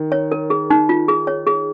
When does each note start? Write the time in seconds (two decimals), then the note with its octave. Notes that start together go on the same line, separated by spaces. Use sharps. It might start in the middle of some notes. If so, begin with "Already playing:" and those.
Already playing: D#3
0.12 C#5
0.32 A#4
0.50 G#4
0.70 D#4
0.89 F4
1.08 G#4
1.27 C#5
1.47 G#4